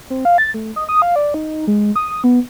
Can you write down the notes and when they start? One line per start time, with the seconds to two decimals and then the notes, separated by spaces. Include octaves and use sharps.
0.10 C4
0.25 F5
0.38 A6
0.54 A3
0.76 D#5
0.89 D#6
1.02 F5
1.16 D5
1.34 D#4
1.67 G#3
1.96 D#6
2.24 B3